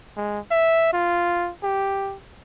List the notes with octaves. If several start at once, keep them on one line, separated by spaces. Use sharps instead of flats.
G#3
E5
F4
G4